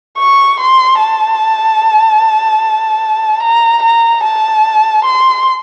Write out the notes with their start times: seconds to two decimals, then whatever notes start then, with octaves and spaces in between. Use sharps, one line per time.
0.18 C#6
0.60 C6
1.00 A5
3.43 A#5
3.83 A#5
4.23 A5
5.05 C6